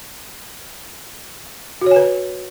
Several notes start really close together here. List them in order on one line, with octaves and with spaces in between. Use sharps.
F#4 C#5 G#5 B4